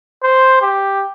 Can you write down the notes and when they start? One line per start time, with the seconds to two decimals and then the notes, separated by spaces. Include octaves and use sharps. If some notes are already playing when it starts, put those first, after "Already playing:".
0.23 C5
0.61 G4